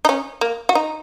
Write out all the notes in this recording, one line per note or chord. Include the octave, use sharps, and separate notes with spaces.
D#4
C#4
A#3
F#4
D#4